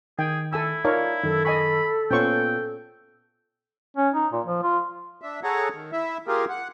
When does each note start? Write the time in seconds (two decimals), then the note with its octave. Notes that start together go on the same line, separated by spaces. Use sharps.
0.19 D#3 G#4 G5
0.53 E4 A4 G#5 E6
0.85 D#4 F4 A#4 C#5 D5 F5 A5
1.24 F#2 D#3 A4
1.45 D#5 G#5 B5 C#6
2.11 A#2 B3 C#4 F4 C5 G5 C#6
3.96 C#4
4.14 D#4
4.32 A#2
4.45 F3
4.63 F4
5.22 D4 E5
5.43 G#4 A4 C#5 F#5 A#5
5.74 D#3
5.92 E4 E5
6.28 A#3 F4 G4 G#4 A#4
6.49 F#5